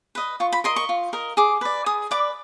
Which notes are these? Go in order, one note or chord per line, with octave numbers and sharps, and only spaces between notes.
B4 D#5
F4 C#6
B5
A#4 D#5 C6
C#6
F4
A#4 D#5
G#4 D6
B4 D5
G#4 D#6
B4 D5 D6